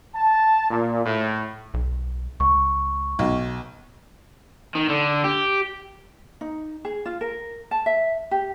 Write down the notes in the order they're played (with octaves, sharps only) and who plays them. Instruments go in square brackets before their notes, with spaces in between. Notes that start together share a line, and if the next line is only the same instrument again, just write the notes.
[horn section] A5
A#2
A2
[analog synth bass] B1
[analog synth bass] C#2 [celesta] C#6
[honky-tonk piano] B1
[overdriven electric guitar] D#3
D3
G4
[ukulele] D#4
G#4
F4
A#4
A5
E5
G4